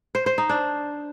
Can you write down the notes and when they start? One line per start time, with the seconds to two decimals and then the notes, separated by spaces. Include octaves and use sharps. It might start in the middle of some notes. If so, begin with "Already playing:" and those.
0.15 C5
0.26 C5
0.38 D#4
0.49 D4